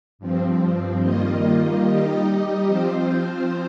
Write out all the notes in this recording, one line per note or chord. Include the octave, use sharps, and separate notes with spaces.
G2 F3 C4
D#3 G3 A#3 F4 D#5
G3 D#4 G4 D#5
F3 C4 F4 C5